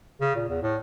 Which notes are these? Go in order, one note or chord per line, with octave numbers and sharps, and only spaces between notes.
C#3
A#2
E2
A2